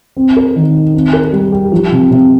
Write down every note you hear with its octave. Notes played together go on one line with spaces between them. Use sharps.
C4
A#4
D#3
D#4
C4
A#4
G3
G4
F3
C3
C3